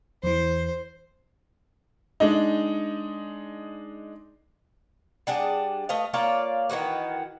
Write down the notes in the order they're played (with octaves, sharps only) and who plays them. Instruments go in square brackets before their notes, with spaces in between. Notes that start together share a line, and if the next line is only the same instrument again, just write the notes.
[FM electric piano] E2 E3 [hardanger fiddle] C5
[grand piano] G#3 D4 D#4
[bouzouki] G3 D4 G#4 F#5
A3 B4 D#5 F5
A#3 F4 C#5 D5
D#3 E3 F#4 B4